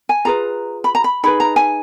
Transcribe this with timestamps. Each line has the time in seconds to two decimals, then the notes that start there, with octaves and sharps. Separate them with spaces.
0.09 G#5
0.25 F4 G#4 B4 A#5
0.84 B5
0.95 A#5
1.04 B5
1.23 D#4 G#4 B4 B5
1.40 A#5
1.56 G#5